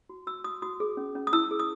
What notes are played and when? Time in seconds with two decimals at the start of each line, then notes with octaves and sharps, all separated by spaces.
0.09 F#4
0.27 F#4 E6
0.44 F#4 D#6
0.62 F#4 D#6
0.80 G#4
0.97 C#4
1.15 C#4
1.27 D#6
1.33 E4 E6
1.51 G#4
1.60 D#6